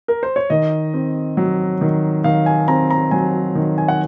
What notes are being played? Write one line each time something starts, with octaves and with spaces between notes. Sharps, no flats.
A#4
C5
C#5
D#3 D#5
C4
F#3
D#3
D#3 F5
G#5
C4 A#5
A#5
F#3 G#5
D#3
G#5
F#5